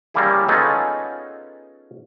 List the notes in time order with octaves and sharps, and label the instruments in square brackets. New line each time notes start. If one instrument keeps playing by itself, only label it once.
[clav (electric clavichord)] G3 A#3 C#4 E4 G#4
B3 C#4 D#4 F4 G#4 A4